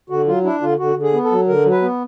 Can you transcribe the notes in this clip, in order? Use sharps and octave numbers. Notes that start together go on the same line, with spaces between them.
D3 F#4
F#3 F4
D4 E4
D3 F4
D3 F#4
D3
G#4
B3
A4
F#3
D3 A#4
F#3
B4
B3